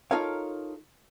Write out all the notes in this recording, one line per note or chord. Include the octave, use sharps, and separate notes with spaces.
D#4 F4 A4 A#4 C#5 F5